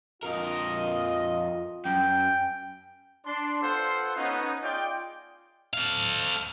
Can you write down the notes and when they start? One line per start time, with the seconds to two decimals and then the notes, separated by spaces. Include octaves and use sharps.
0.23 F2 F4 A#4 D#5
1.85 F#2 G5
3.25 D4 C6
3.62 B3 F4 A4 C5 F5 F#5
4.17 B3 C#4 D#4
4.63 F4 G#4 D5 D#5 G5
5.73 A4 F5